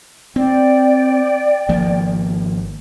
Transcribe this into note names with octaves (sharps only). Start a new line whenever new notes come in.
C4 D5 G5
G#1 F3 A#3